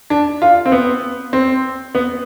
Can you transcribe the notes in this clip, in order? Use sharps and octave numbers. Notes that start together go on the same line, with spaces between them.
D4
F4
C4
B3
C4
B3